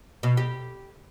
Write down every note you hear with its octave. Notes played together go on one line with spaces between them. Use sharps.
B2
G4